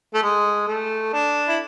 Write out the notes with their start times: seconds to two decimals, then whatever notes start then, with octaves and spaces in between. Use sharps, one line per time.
0.14 A3
0.23 G#3
0.68 A3
1.13 D4
1.48 E4